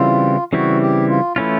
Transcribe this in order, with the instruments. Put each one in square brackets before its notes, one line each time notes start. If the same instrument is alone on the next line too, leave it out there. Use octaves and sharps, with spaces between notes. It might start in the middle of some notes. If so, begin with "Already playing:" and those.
Already playing: [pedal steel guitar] C#3 E3 G3 C4 E4 [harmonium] F4
[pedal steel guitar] C#3 E3 G3 C4 E4 [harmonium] F#4
[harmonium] G4
F4
[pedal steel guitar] E3 A3 C#4 F4 [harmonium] E4